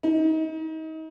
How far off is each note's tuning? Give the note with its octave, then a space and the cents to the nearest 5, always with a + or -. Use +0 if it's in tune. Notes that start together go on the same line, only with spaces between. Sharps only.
D#4 +30